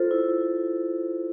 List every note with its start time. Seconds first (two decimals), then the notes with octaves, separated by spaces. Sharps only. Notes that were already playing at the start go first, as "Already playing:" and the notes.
Already playing: F4 A4 C5
0.11 E4